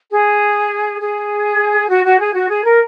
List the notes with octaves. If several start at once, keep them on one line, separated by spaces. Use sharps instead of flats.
G#4
G#4
F#4
F#4
G#4
F#4
G#4
A#4